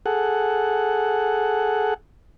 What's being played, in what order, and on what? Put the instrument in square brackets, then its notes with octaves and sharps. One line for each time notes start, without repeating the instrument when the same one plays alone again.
[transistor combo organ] G#4 A4 F#5